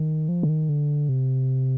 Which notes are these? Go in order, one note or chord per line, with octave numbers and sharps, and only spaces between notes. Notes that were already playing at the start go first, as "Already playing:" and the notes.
Already playing: D#3
F3
D3
D#3
D3
C3